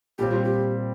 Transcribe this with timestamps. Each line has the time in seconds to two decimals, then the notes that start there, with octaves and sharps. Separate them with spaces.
0.18 A#2 G3 C4 G4
0.31 F4
0.44 G4